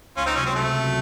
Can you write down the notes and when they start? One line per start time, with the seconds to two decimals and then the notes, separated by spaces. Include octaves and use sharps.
0.17 C#2 C#4 F4
0.26 C4 D#4
0.35 C3 F#3 C#4
0.46 C4
0.55 C#2 A3
0.74 C3 F#3